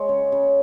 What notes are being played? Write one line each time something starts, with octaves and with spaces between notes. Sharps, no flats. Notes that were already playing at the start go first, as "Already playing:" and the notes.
Already playing: G#3 C#5
C#3
C#3